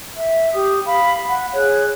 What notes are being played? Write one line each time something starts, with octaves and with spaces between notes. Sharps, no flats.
E5
G4 D#6
F5 B5
F#5
G#4 C#5 F#6